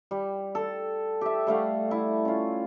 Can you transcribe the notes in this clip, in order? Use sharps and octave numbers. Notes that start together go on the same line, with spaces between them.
G3
A4
G4 E5
G3 A3 F5 F#5
E4
C#4 F4